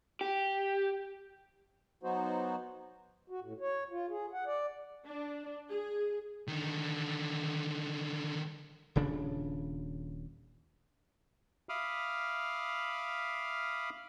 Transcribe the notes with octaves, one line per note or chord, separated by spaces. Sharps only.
G4
F#3 B3 D#4 F#4 C5
F#4
A2
C#5
F4
G#4
F#5
D5
D4
G#4
D3 D#3
D#1 C#3 D4
E5 F5 B5 D6 D#6 F6